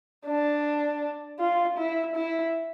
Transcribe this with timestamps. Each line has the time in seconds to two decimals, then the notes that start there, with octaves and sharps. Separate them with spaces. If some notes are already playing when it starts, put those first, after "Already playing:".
0.26 D4
1.39 F4
1.77 E4
2.15 E4